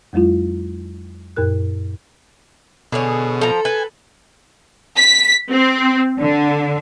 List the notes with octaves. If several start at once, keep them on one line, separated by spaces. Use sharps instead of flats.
F2 F#3 G#3 E4 F4
F#2 A#2 A#4 F#6
B2 D3 G#4 C#5
F3 A4 A#5
B4 G#5
B6
C4
D3